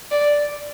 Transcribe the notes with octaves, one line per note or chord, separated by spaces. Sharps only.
D5